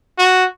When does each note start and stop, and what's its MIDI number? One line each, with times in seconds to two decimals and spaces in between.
0.18 0.45 66